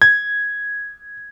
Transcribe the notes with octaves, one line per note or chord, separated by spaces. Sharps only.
G#6